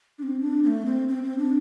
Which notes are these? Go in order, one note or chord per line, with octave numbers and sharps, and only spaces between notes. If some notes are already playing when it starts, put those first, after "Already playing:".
D4
C4
D4
C4
A3
C4
C4
C4
D4